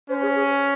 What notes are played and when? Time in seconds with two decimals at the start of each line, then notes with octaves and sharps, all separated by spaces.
0.09 C#4 C5
0.22 G#4
0.35 G#4